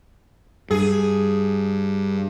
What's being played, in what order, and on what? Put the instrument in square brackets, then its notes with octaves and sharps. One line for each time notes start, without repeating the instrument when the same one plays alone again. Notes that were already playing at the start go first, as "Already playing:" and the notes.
[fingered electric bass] G2 [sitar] G#4